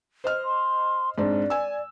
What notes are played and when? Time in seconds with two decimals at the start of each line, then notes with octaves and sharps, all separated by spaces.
0.24 C5 D#5 F6
0.44 C6
1.18 G#2 C4 D4 D5
1.50 G#5 E6